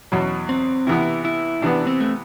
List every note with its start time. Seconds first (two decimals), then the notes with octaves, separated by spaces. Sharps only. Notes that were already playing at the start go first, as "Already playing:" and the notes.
0.12 E2 B2 F#3
0.49 C4
0.87 C3 E3 B3 E4
1.25 E4
1.62 C3 E3 B3 D4
1.87 C4
2.00 A3